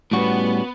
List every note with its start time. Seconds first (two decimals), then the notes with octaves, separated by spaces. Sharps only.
0.11 A2 G3 B3 C#4 F#4